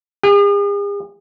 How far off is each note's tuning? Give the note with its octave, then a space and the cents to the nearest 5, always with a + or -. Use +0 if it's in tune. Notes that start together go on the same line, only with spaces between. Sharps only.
G#4 -45